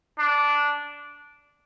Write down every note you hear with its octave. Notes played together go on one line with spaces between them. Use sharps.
D4